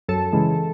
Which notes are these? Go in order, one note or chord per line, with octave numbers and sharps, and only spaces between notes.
F#2 A4
C#3 E3 G#3